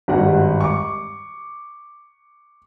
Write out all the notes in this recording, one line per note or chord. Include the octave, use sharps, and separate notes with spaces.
G#1 G2 G3 F#5
C#6 D6